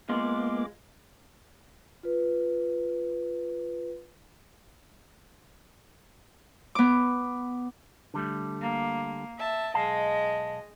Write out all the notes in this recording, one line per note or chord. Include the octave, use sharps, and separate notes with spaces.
G#3 A#3 B3 F4 D6
F4 B4
B3 D6
D3 G3 A3
A#3
E5 A5
B1 G#3 D#5 F5 A5